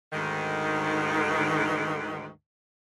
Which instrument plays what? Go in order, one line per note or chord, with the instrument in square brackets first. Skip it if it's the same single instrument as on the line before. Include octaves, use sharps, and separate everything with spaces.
[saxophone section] D2 G#2 D#3